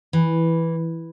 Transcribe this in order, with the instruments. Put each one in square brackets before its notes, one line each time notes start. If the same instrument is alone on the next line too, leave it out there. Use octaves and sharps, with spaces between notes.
[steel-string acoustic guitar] E3